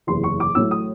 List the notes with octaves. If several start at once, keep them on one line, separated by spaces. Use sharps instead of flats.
F#1 E2 C3 E3 C6
C#6
D6
A1 A2 F#3 A3 E6
D#6